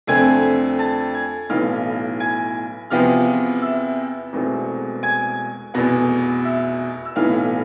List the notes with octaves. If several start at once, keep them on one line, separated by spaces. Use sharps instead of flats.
F2 D3 A3 C4 G#5 G#6
A5 A6
G#5 G#6
B1 A2 E3 B3 F5 F6
G#5 G#6
E2 C3 F3 B3 F5 F6
E5 E6
E1 E2 B2 A3 C4
G#5 G#6
F1 E2 B2 B3
E5 E6
E6
B1 A2 E3 B3 F5 F6